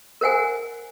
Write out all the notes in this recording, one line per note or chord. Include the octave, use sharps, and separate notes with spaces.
A#4 C5 F#5 G#5